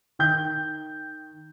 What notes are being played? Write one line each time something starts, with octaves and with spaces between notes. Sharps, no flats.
D#3 G5 G6